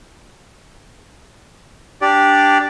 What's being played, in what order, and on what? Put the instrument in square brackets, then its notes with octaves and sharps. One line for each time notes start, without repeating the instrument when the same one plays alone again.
[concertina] D4 G4 D5